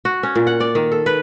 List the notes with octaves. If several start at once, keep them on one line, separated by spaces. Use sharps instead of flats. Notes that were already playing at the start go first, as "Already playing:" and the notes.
F#4
C#4
A#2
F#5
D5
D#3
A4
B4